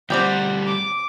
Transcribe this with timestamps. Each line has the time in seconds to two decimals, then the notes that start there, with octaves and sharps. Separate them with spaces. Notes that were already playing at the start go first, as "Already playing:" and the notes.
0.10 D2 G3 C4 D5 F#5 G5
0.67 D6